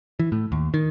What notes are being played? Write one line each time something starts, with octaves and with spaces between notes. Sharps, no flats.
E3
A2
D#2
D#3